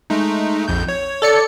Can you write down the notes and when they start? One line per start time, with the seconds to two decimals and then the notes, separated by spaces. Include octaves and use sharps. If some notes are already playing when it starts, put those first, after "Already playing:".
0.10 G#3 A3 D#4
0.68 A#1 F2 G6
0.88 C#5
1.22 A4 D5 C#7